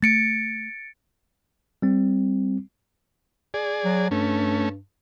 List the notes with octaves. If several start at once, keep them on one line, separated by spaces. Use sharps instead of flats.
A3 A6 C#7 D7
G3 C4
G#4 D5
F#3
G2 A3 C#4